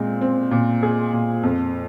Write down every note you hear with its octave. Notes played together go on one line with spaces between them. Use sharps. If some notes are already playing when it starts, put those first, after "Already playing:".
Already playing: A#2 G#3 C4
C4
A#2
G#4
A#2
F2